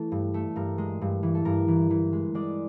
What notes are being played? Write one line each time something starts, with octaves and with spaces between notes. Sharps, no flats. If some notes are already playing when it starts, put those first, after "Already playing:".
Already playing: E3 A3 A4
G2
A3
G2 A#4
G#3
G2
E3
A4
G2 A#4
E3
E3
G#3
G#3 D5